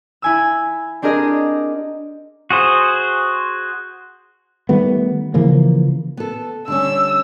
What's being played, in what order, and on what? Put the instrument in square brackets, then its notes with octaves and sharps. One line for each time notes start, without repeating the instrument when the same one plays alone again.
[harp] E4 G#5 E6
C4 D4 G4 G#4 A#4 D#5
[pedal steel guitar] F#4 G#4 C5
[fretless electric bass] D#3 G3 A3 B3
C#3 E3 F3 A#3
[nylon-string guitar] B3 A4
[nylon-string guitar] D3 G3 C#4 [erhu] E6